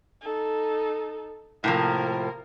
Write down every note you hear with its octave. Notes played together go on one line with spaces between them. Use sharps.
D#4 A4
A2 C3 F3 A#3 A#4